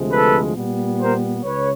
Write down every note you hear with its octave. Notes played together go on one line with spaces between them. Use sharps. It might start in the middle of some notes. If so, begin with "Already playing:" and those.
Already playing: D2 C3 F3 G#3
A4 B4
A#2 G3 B3
A#4 C5
C#2 C#3 B4 C#5